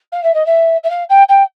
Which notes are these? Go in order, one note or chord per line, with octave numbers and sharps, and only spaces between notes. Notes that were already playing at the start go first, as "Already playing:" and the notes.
F5
E5
D#5
E5
E5
F5
G5
G5